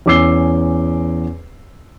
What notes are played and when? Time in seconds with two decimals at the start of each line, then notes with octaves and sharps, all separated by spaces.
0.06 E2 C#4 D6 E6 C7 G7